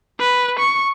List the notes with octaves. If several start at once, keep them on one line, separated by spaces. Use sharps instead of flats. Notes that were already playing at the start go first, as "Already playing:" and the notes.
B4
C#6